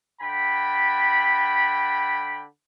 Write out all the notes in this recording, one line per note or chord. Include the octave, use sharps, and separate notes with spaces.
D3 G5 B5